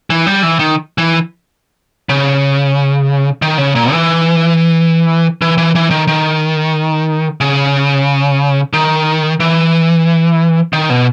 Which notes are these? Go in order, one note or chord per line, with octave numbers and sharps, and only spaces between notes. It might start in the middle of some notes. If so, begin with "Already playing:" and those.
E3
G3
E3
D#3
E3
C#3
D#3
C#3
A#2
E3
E3
E3
E3
D#3
D#3
C#3
D#3
E3
D#3
B2